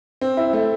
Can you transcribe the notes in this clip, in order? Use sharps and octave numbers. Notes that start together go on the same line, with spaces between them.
C4
E4
A3